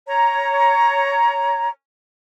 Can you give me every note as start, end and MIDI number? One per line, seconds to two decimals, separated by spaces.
0.08 1.68 73
0.08 1.68 82